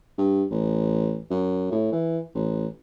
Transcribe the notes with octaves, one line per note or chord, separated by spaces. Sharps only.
G2
A1
F#2
A2
E3
A1